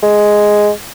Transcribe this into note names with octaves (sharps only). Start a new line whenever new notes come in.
G#3